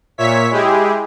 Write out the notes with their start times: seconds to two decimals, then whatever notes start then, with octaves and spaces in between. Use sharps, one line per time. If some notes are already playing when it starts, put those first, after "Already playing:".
0.18 A#2 C#5 E5 B6
0.50 G#3 E4 G4 G#4